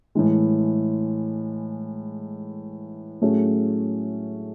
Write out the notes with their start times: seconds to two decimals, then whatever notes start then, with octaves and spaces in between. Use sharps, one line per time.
0.15 A2 E3 G#3
3.21 A2 F#3 A3 C#4 G#4